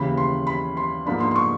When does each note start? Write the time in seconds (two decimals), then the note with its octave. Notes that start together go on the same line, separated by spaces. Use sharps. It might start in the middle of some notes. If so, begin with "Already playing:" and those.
Already playing: D#2 C#3 E3 B5
0.17 C6
0.47 B5
0.77 C6
1.06 G#2 F3 A#3 D4 B5
1.20 C6
1.31 C6
1.36 C#6